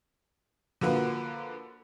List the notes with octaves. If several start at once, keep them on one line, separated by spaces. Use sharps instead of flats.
D3 F3 A#3 F#4 B4